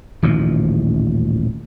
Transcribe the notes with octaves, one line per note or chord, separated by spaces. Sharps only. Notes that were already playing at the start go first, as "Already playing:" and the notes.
D#1 A1 D#3 F3